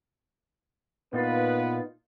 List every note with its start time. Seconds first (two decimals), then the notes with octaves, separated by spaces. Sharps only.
1.13 A#2 B3 D#4 F4 B4